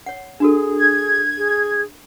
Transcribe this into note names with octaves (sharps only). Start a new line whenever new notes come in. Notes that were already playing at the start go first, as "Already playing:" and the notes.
C#5 F#5
D4 F#4 G#4 A4
G#6
G#4